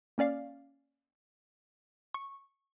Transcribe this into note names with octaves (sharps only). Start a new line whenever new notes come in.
A#3 C#4 D5 F5
C#6